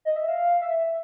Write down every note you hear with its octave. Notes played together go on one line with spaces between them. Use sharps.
D#5
E5
F5
E5